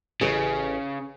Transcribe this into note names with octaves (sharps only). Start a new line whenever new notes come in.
A1 C#3 G#4 B4 D#5